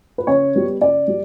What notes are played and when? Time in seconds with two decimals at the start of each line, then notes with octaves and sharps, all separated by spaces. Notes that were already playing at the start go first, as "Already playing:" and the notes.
0.18 B4
0.27 C#3 C#5
0.55 G3 B3
0.81 C#3 D5
1.08 G3